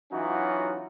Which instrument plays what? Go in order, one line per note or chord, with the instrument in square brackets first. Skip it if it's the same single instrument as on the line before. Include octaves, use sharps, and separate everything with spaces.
[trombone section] E3 F#3 C#4 D#4 F4 F#4